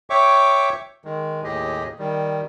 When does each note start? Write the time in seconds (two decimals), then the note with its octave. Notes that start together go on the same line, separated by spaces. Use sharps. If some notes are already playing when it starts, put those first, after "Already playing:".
0.10 C#5 E5 G5 C#6 D6
1.05 D#3 G#3
1.44 D#2 A2 G4 G#4 D#5
1.99 D#3 G3